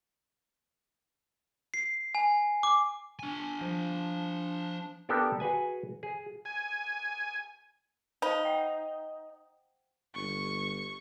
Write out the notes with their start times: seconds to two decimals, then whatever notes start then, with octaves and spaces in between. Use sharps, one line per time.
1.74 C7
2.15 G#5
2.63 D6
3.19 D4 G#5
3.61 F3
5.09 B3 D4 G4 A4 A#4
5.40 F#4 G#4 B4 G#5
6.03 G#4
6.45 G#5
8.22 D#4 C5 F5 B5
8.45 F#5 G5
10.15 G1 C#6